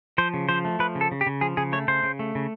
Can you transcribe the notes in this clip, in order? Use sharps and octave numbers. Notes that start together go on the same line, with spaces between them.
F3 C5
C#3
F3 C5
A3
F3 B4
C#3
A4
C#3
G4
C#3
F3 G#4
C#3 G#4
A3 C#5
C#3 C5
C#3
A3
C#3